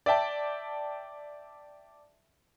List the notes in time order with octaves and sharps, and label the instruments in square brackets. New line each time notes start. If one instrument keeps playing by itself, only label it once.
[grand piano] D5 E5 G5 A5